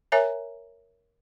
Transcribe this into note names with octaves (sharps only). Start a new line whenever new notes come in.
A#4 C#5 E5 G#5 A#5